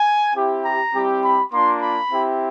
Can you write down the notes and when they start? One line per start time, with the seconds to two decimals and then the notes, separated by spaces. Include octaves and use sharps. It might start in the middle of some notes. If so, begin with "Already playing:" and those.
Already playing: G#5
0.34 C4 E4 G4
0.64 A#5
0.93 G3 C4 E4 G4
1.23 B5
1.51 A#3 D4 F4 C6
1.81 B5
2.11 C4 E4 G4